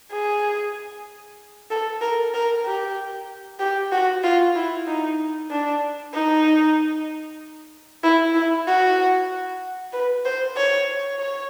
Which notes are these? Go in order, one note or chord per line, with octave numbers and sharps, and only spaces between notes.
G#4
A4
A#4
A#4
G4
G4
F#4
F4
E4
D#4
D4
D#4
E4
E4
F#4
B4
C5
C#5
C#5